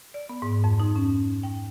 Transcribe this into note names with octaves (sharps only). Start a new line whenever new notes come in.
D5
B3
G#2
F2
D#4
C#4
G5